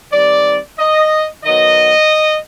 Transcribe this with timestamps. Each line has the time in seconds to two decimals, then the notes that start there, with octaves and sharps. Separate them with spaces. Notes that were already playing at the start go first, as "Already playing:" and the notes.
0.12 D#3 G3 C4 D5
0.79 D#5
1.45 D#3 F#3 B3 D#5